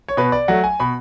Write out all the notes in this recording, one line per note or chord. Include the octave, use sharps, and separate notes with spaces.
C#5
B2 B4
D5
F#3 A3 F#5
G#5
B2 B5